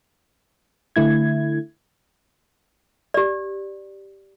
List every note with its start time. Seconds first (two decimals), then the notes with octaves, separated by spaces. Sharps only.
0.96 D3 A3 E4 G#6
3.14 G4 D5